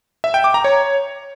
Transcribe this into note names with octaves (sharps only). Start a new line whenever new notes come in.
E5
G5
D6
A#5
C#5